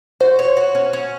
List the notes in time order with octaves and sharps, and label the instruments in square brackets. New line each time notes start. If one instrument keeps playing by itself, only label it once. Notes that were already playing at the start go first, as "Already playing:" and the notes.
[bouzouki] F#4 [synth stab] C5
[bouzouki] C#5
F#4
C#4
C#4